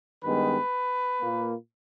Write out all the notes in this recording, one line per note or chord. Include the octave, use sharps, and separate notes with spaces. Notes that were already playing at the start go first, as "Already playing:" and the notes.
G2 D#3 G#3 B3 B4
A#2 A#3